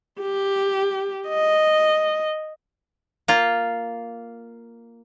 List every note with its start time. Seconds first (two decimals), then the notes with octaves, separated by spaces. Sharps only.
0.20 G4
1.28 D#5
3.28 A#3 F4